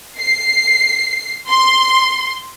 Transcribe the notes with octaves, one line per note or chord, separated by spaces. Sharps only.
C7
C6